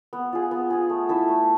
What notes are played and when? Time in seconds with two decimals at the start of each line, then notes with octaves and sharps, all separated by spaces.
0.13 B3
0.33 F4 G#4
0.51 B3
0.70 F4 G#4
0.90 A3
1.09 E4 A4 E5
1.28 A3